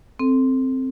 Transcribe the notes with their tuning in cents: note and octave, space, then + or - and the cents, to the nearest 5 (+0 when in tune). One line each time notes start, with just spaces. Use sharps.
C4 +0 A4 +0